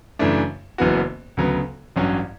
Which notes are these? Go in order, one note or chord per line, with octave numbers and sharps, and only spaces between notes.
F#2 C#3 E3 A3 D4
F#1 F#2 E3 B3 F#4
D2 C#3 F#3 B3
A1 G2 F#3 C#4